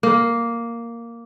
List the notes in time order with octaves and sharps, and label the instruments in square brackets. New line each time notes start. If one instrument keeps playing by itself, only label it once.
[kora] A#3